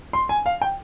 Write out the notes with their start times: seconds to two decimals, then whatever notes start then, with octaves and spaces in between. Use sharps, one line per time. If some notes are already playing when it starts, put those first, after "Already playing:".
0.13 C6
0.29 G#5
0.46 F5
0.61 G5